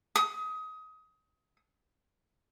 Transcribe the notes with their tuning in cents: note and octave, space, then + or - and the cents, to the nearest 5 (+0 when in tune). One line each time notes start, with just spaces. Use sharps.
D#6 +25